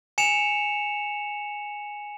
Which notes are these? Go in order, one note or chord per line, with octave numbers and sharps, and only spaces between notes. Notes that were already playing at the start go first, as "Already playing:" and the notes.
G#5 C#7 E7 F7